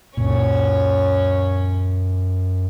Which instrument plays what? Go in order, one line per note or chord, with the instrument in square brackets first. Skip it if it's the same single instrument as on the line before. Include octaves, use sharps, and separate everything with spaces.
[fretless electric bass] C#2 A#2 [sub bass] F#2 [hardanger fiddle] C#4 C#5